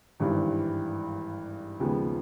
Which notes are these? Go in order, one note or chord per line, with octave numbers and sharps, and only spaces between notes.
G#1 G2 E3 G3
D#2 C#3 F3 G#3 B3